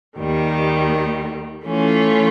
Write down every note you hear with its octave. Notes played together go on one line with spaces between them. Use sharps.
D#2 D#3 G3
E3 A3 C#4 F4